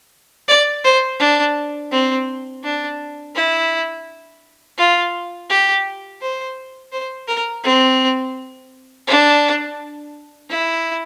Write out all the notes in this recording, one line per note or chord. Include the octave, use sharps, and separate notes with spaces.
D5
C5
D4
C4
D4
E4
F4
G4
C5
C5
A#4
C4
D4
E4